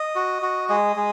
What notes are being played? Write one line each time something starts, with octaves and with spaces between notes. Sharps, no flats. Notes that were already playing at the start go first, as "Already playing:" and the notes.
Already playing: D#5
F#4
F#4
G#3 D#5
G#3